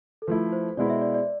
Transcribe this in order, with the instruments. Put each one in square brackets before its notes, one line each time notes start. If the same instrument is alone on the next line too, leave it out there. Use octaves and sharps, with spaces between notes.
[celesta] A4
[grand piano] F3 A3 E4 [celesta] B4
[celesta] C5
[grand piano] B2 G#3 B3 E4 [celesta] D5
[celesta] E5
D5
D5